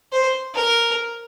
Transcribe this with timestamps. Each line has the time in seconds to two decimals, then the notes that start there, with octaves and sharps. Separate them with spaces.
0.13 C5
0.55 A#4